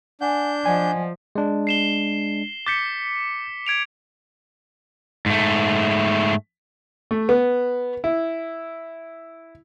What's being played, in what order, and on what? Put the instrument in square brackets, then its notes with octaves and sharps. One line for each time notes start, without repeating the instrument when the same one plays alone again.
[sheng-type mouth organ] D4 G6 [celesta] F#5 G#5
[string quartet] F3 [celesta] D5 D#5 F#5 [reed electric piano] G#5
[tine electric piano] G#3 D4
[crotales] C7 E7 G7
[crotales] D6 B6 C#7 [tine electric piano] G6 A6
[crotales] G#6 D7 F7
[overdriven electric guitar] G#2 A3
[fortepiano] A3
B3
E4